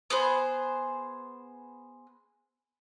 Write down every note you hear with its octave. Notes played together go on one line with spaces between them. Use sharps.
B3 G#4 C5